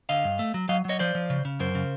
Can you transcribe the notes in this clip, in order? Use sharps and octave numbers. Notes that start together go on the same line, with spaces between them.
D3 D#5 F5
G2
A3
F#3
F#3 D#5 F5
F#3 C#5 D#5
F3 C5 D5
F3
C#3
C#3
F#2 A#4 C5
C#3